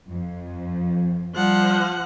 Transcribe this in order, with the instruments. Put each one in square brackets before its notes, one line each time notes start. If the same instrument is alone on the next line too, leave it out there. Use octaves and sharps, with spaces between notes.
[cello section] F2
[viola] F3 F#5 [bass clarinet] G3